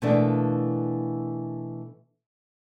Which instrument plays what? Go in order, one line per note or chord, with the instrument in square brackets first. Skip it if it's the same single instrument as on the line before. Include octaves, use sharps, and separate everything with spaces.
[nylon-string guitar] B2 E3 A3 A#3 D4